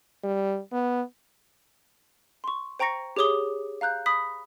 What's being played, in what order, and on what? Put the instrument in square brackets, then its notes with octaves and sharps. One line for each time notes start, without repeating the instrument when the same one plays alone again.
[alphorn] G3
B3
[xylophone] C6 C#6
C5 G5 A#5 C#6 A#6 C#7
G4 G#4 C#5 D6 D#6 G7
F5 A#5 F#6 G6
B5 D#6 B6